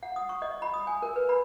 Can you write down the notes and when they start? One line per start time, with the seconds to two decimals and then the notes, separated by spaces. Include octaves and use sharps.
0.03 F#5
0.16 D#6
0.29 C#6
0.42 D#5
0.62 B5
0.74 D#6
0.87 G#5
1.02 A#4
1.16 B4
1.29 B5